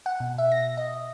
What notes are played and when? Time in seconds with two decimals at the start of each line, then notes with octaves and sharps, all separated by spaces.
0.06 F#5
0.20 B2
0.38 E5
0.52 A#6
0.77 D#5